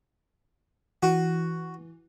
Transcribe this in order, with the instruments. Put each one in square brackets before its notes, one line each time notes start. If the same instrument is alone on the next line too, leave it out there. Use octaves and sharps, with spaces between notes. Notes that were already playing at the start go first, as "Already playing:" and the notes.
[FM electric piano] E3 [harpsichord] F#4